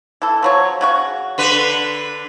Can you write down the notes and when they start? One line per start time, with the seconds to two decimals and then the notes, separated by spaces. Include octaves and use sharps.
0.22 E3 A4
0.43 F3 F#3 C#5
0.81 C#3 F#4 C#6
1.38 D3 B4